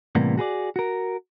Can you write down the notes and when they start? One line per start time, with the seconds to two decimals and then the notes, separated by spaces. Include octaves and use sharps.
0.15 A2 C3 E3 G3 A#3 B3
0.38 F#4 G#4 B4 D5
0.76 F#4 A#4